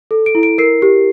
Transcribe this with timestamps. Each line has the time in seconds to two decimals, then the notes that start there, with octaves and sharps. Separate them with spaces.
0.11 A4
0.26 D7
0.35 E4
0.43 D7
0.58 A#4 C7
0.82 G4